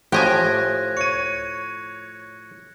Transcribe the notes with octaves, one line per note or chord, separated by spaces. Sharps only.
A2 F3 G4 D#5 G#5 F#6 G#6 A#6
C#5 C#7 D#7